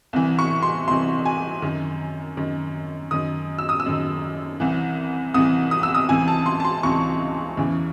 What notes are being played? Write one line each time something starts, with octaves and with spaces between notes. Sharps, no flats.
C2 C3 E3
C#6
C6
C2 C3 E3 C6
G#5
F#2 D#3
F#2 D#3
F#2 D#3 D#6
E6
D#6
E6
F#2 D#3
C2 C3 E3
C2 C3 E3 D#6
D#6
E6
D#6
C#2 C3 E3 G#5
A5
C6
A5
C6
C#2 C3 E3 C#6
E2 C#3 E3